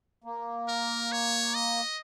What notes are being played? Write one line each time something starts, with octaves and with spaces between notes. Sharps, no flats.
A#3
A#4
C#5
D#5